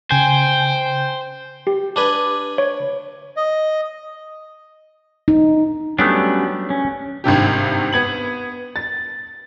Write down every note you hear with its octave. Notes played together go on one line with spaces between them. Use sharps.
C#3 C5 G5 G#5 G6
G4
D4 B4 G#5
C#5
D#5
D#4
F#3 G3 A3 B3 C#4 D4
C#4
G#1 G2 C3 G4
B3 G#6 F#7
A6